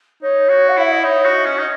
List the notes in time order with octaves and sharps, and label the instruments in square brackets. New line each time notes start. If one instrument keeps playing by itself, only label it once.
[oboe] D#4 [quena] C#5
[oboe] F#4
[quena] F#5
[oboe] E4 [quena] E5
[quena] D#5
[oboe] D#4 [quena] C#5
[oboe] F#4
[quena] D#5
[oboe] C#4
[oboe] D#4 [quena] D#5